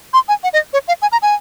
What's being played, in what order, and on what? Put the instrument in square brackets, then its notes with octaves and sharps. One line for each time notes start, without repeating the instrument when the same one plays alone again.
[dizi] C6
G#5
F#5
D#5
C#5
F5
G#5
A#5
G#5